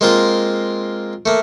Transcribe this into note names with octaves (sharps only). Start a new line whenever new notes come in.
G#3 A#3 C4 F4 A#4
A3 A#3